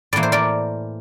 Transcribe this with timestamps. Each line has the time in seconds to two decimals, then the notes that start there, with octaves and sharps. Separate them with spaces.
0.13 A2 E3 A#3 D5
0.23 C5
0.32 A#4 D5